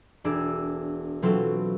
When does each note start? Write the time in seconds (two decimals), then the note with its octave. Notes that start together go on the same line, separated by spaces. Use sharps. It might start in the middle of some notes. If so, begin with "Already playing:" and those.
0.24 E1 D4 G#4 E6 D7
1.22 B2 E3 F#3 C4 F4 A4